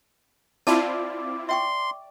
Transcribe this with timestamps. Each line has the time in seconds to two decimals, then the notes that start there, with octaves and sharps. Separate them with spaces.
0.67 C4 E4 F4 D5 A5
1.49 E5 G5 C6 C#6